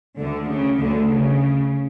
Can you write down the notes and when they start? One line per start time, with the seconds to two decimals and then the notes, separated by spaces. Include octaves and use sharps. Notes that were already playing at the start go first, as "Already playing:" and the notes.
0.19 D2 D3
0.49 C#3
0.79 D2 D3
1.09 C#3